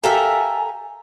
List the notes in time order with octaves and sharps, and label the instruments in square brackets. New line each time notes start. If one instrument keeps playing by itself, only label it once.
[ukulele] G4 F5 [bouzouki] A4 A#4 E5 [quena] G#5